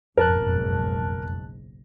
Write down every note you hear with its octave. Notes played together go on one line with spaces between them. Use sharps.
F#1 B1 F2 G#2 A#4 A5 F#6